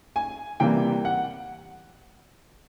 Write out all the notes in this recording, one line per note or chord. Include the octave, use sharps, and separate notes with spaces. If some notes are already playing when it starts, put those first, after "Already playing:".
G#5
C3 E3 G3 A#3 G5
F#5